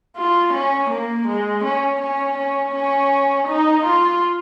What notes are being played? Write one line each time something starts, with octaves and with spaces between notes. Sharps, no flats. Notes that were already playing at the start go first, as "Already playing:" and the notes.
F4
C#4
A#3
G#3
C#4
C#4
C#4
C#4
D#4
F4